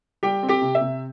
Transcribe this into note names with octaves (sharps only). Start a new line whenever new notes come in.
G3 G4 G5
C4
G4 G5
C3
E5
C3